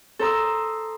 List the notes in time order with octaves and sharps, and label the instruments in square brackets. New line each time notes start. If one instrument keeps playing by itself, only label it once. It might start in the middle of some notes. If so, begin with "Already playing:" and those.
[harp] A4 C5 A#5 D#6 E6